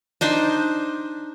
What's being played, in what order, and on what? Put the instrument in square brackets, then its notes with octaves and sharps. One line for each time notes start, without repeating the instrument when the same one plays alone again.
[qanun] D4 D#4 C5